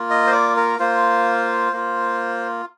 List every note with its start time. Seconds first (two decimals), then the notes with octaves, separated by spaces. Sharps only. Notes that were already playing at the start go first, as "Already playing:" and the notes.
Already playing: A#3 F4
0.10 D#5
0.27 C5
0.32 D5
0.57 A#4
0.79 A#3 F4 C5
1.73 A#3 F4